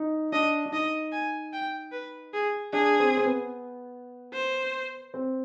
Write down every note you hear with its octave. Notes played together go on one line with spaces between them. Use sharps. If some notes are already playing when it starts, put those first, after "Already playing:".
Already playing: D#4
D4 D#5
D4
D#4 D#5
G#5
G5
B4
G#4
D4 G#4
C4
C4
B3
C5
C4